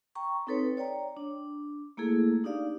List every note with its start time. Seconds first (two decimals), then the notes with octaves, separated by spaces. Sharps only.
0.15 G5 A#5 C#6
0.47 C4 D#4 A4 B4 C#5
0.77 C#5 D5 G5 A#5
1.17 D4
1.97 A3 A#3 E4 G#4 A4
2.44 D4 D#4 G4 D5 F5